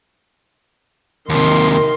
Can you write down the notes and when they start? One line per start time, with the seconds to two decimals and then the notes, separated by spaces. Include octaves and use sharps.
1.29 D#2 C3 D#3 C6